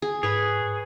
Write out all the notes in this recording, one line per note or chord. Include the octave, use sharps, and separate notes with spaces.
G#4
G#2 G#4 B4 C#5